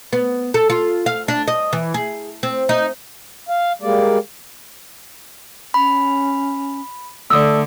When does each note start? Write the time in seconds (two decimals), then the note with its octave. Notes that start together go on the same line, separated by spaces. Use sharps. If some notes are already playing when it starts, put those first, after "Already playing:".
0.13 B3
0.54 A4
0.70 F4
1.06 F5
1.28 D4
1.48 D#5
1.73 E3
1.94 G#4
2.43 C4
2.69 D#4
3.49 F5
3.82 G3 G#3 A#3 D5
5.74 C#4 B5
7.30 D3 A3 D5 D#6 E6